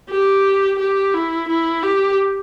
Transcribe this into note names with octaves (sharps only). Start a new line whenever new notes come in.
G4
G4
E4
E4
G4